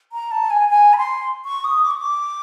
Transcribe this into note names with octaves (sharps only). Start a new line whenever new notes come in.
A#5
A5
G#5
G#5
B5
C6
C#6
D#6
D6
C#6
D6